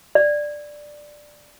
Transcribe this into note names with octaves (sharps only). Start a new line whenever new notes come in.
D5